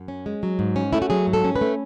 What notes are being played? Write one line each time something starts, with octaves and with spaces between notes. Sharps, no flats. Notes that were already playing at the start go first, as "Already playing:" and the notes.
Already playing: F#2
C#4
G#3
F#3
G#2
C#4
A3 E4
F#4
F#3 G#4
G#2
A4
C#4
B4
A3